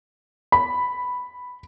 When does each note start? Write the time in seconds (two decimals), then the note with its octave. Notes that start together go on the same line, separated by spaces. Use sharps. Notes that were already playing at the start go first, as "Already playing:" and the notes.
0.52 B5